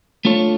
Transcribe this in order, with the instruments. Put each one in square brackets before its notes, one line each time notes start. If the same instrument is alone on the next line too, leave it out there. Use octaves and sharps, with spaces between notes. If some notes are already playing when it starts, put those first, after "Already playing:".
[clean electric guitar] A3 D4 F4 A4 C#5